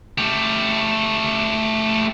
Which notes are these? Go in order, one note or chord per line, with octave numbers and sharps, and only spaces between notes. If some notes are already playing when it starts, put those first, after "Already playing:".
A3 G4